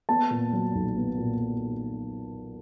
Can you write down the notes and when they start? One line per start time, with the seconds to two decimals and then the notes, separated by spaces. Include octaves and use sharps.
0.09 B3 A5
0.30 A#2
0.53 F#3
0.74 B1
0.97 B3
1.18 A#2